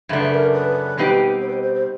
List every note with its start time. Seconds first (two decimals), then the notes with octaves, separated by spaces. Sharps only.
0.09 F#2 C#3 A3 D4
0.20 B4
0.31 A#4
0.53 B4
0.97 B2 G3 C4 D#4 G4
1.41 C5
1.48 B4
1.53 C5
1.63 C5
1.75 C5